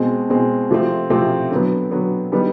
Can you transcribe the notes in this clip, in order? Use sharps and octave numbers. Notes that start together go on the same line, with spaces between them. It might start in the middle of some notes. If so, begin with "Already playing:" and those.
Already playing: B2 G#3 C4
B2 G#3 C4
C3 F3 A3 C4
C3 F3 A3 C4
D3 F#3 B3
D3 F#3 B3
D3 G3 B3 D#4